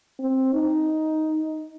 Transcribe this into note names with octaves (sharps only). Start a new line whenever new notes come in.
C4
D#4